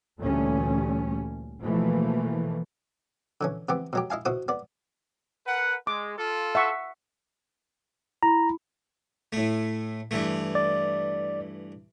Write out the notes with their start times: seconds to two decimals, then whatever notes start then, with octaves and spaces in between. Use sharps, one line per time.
0.20 D2 A#2 E3 G3 A3 C#4
1.61 B2 E3 F3 A3 A#3
3.41 D3 E3 C#4
3.69 C3 E3 B3 G4
3.93 B2 F#3 G4
4.10 E4 D#5 F5 G#5
4.25 B2 E4 F#4 C5 D#6
4.48 B3 D5
5.47 A#4 B4 F#5
5.87 G#3 D6
6.18 F4 A4
6.55 E5 F#5 C#6
8.23 E4 A#5 B5
9.33 A2 A3
10.11 G2 E3 A3
10.55 D5